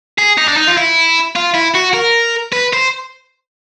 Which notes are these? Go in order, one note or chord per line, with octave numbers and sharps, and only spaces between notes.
G#4
D#4
D4
D#4
F4
E4
F4
E4
F#4
A#4
B4
C5